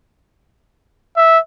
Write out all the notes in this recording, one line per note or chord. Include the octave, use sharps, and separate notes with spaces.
E5